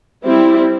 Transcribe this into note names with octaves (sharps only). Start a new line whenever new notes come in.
G3 C4 E4